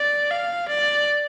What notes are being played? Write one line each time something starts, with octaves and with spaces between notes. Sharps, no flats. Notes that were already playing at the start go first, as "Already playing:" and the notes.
Already playing: D5
F5
D5